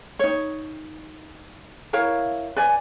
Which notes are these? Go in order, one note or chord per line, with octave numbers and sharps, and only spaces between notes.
D#4 C#5
E4 A#4 C#5 F5
B4 D5 G#5